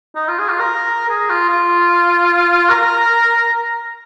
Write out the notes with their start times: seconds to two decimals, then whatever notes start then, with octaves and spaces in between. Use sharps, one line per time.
0.15 D#4
0.28 F4
0.39 G#4
0.49 F4
0.60 A#4
1.09 G#4
1.30 F4
1.49 F4
2.70 A#4